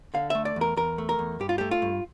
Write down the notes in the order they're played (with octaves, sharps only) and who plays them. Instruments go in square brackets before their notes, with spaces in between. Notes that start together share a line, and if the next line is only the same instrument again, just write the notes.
[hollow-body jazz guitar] D3 F5
A3 E5
D5
E2
A#4
E2 A#4
A3
A#4
E2
G2 G4
F4
A3 G4
F4
G2